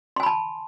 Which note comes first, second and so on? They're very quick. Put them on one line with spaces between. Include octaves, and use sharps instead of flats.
C6 G#5 B5 A5